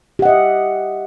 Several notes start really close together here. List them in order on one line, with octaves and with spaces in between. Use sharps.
G4 F#5 D#5 E5